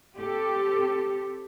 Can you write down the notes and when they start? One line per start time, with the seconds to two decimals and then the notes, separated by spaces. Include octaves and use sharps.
0.17 C4 G4 A4